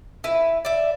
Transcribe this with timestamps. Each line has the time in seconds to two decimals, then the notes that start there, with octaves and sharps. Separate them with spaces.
0.24 E4 B4
0.65 D5 E5